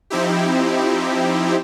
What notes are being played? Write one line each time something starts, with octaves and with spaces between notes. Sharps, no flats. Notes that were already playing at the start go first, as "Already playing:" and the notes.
F3 C4 D#4 E4 G4